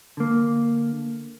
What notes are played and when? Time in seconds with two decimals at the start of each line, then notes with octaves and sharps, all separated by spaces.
0.17 D3 A#3